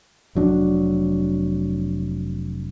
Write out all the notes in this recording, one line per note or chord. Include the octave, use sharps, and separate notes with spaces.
F1 F#3 D4